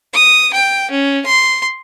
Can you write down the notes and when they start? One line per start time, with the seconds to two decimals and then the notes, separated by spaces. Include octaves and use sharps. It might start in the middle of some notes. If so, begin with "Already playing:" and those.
0.13 D#6
0.53 G5
0.91 C#4
1.26 C6